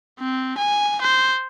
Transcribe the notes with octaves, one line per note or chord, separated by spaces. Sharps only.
C4
G#5
C5